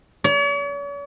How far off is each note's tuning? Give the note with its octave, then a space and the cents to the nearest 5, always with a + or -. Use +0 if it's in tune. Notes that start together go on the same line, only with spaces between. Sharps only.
C#5 +45